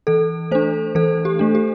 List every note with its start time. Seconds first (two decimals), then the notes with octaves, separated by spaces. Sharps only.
0.07 E3 A4
0.51 A3 D4 C5
0.95 E3 A4
1.25 G4
1.39 A3 D4
1.55 G4